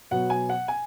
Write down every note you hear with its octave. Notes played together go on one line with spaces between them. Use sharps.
B2 F#3 B3 F#5
G#5
F#5
G#5